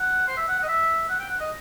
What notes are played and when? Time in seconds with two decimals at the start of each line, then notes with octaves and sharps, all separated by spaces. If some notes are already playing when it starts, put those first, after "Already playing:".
Already playing: F#5
0.27 C5
0.37 E5
0.48 F#5
0.58 F#5
0.63 D#5
0.68 E5
1.09 F#5
1.19 G5
1.29 F#5
1.40 D#5